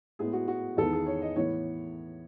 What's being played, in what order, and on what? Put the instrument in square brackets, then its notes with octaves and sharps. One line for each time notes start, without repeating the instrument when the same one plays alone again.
[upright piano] A2 G#3 B3 G#4
F#4
F#4
E2 D#3 G#3 B3 A4
G#4
C#5
D#5
A2 E3 B3 C#5